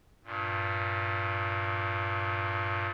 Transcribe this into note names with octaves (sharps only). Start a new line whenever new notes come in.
G2 A#2